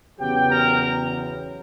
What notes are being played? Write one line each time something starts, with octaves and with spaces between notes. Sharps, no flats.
E2 C#3 F#3 B3 G4 G5
A#4 A#5